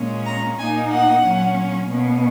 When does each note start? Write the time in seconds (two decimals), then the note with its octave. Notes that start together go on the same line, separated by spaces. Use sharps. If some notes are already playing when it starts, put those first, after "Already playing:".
Already playing: A#2 G#3 C#4
0.26 A#5
0.58 A#2 A#3 D#4 G#5
0.90 F#5
1.22 A#2 F#3 C#4
1.88 B2 A#3 C#4